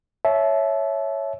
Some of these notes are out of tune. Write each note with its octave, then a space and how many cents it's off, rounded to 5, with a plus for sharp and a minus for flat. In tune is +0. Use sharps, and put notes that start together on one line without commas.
C#5 +0 E5 +0 A5 -35